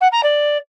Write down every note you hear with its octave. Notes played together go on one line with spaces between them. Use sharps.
F#5
A#5
D5